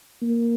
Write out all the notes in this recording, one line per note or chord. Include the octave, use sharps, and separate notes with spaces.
A#3